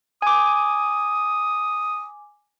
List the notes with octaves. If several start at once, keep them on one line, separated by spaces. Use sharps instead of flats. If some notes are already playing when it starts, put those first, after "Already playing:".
G#5 D6 D#6